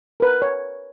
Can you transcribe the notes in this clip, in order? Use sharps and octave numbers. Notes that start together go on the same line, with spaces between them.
A#4 B4
B4 C#5